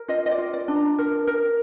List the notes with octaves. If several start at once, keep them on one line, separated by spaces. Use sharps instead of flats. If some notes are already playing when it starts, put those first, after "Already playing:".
Already playing: A#4
F4 D#5
D#5
D5
F4
D5
D4
A#5
A#4
A#4